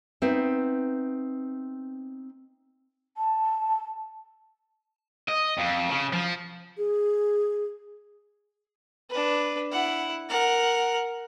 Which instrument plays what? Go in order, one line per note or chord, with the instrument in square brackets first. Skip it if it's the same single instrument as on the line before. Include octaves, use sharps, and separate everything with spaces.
[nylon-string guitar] B3 C4 D#4 B4 E5
[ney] A5
[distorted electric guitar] D#5
F2
C#3
F3
[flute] G#4
[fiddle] D4 B4
E4 F#5
A#4 F#5